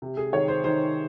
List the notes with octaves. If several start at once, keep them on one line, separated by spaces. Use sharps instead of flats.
C3
G#4
D#3 C#5
C5
D#3 C5